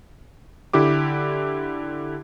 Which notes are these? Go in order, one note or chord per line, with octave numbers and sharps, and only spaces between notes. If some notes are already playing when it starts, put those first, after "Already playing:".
D3 E4 G4 D6